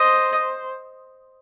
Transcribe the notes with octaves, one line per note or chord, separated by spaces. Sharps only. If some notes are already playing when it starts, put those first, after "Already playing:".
Already playing: C5 D#5